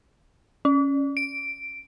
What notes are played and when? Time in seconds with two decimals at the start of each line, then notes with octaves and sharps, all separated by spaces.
0.65 C#4
1.17 D7